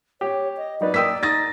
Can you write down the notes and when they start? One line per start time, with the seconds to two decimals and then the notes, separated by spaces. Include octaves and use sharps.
0.21 G4 C#5
0.57 D#5
0.81 F#3 D#4 B4 D5
0.94 A#3 G5 D#6 E6 B6
1.23 D#4 D#6 A6 A#6